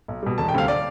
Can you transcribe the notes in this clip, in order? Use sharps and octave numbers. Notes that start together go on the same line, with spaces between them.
B1
B2 G3
E1 A5
G5
D2 C3 G3 F5
D5